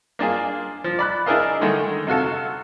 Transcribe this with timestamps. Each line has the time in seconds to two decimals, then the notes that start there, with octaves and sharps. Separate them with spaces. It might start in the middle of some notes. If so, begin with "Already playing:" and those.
0.19 A#3 D4 F4 G#4
0.84 F3
0.99 D5 B5 F#6
1.26 D4 E4 G#4 A#4 D#5 F5
1.61 D3 D#3 G#3 A3
2.07 C3 F4 F#4 A4